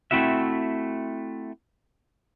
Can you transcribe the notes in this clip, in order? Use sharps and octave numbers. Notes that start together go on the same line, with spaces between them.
A3 C4 E4 F#4 E5